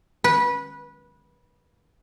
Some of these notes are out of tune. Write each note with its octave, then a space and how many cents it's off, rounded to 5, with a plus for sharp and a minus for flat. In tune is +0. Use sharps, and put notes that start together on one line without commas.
B4 -20